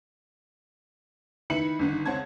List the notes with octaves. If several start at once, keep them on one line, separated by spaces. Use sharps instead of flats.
D#3 E4 B4 B5 C#7 F#7
G1 D3 D#3
C#2 C4 C#5 F#5 A5 G#6